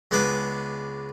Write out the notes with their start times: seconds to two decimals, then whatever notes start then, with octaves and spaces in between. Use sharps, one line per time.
0.11 C#2 G#3 B3 D4 B4 D6